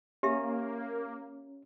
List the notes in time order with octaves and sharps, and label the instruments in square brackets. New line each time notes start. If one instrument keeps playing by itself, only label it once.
[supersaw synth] A#3 [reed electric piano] C#4 [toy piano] G4 E5